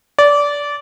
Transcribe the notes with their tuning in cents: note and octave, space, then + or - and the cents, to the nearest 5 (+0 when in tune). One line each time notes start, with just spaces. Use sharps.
D5 -20